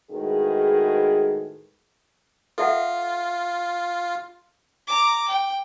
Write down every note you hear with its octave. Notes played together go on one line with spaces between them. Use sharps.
A2 D#3 G#3 F#4 G#4 B4
F4 A4 E5 F#5
A#5 D6
G5